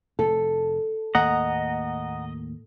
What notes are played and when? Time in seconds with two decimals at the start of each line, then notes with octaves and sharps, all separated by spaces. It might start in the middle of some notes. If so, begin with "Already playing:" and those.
0.19 F1 A4
1.15 D#2 A2 A#3 D#5 F#5 A#5